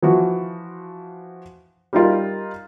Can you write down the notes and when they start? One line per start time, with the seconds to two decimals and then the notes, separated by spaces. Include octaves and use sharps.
0.03 E3 F3 F#4
1.93 G3 D#4 F4 A#4